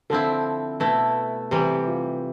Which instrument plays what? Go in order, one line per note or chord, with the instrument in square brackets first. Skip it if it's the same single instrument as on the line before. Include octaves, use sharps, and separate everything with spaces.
[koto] D3 F3 C4 E4 [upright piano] A4
[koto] B2 A3 E4
[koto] C3 E3 G3 [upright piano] G4
[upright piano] F4